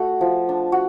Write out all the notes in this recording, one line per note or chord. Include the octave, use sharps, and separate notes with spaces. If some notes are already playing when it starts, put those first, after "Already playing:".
Already playing: A3 F#4
F3
D4
F#4